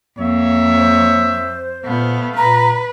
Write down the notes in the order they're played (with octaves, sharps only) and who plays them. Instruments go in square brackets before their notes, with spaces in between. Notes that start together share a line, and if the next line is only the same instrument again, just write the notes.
[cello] F2 [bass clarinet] A#3 [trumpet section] C#5 E5
[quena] C5
[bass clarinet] A#2 [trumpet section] A3 F5 [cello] B3
[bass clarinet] A#2 [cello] B4 [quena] A#5